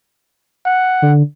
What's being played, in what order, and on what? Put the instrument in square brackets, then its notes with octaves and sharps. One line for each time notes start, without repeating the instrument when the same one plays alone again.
[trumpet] F#5
[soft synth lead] D3